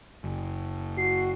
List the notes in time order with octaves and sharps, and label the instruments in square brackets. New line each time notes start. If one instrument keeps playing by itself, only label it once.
[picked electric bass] F#1
[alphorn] F#4 [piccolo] C7